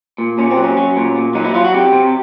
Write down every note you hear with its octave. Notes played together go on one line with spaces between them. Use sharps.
A#2
A#2 C#4
C4
F#3
C#4
F#3
A#2
A#2
F#3 D#4
E4
F#3 F4
F#4
C3 G4
C3